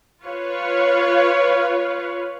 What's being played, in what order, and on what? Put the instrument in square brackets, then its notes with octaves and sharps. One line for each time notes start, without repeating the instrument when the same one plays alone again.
[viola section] F4 B4 C#5 F5